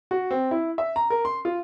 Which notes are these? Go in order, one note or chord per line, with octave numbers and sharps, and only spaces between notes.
F#4
C4
E4
E5
A#5
A#4
C6
F4